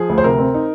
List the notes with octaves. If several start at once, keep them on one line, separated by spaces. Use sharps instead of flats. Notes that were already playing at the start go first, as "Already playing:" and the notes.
Already playing: F3 G#4
D2
C5
C3 A#4
C4
D#4